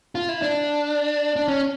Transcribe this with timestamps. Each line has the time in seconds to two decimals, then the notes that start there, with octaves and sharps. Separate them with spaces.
0.15 F4
0.29 E4
0.42 D4
1.36 D4
1.48 C#4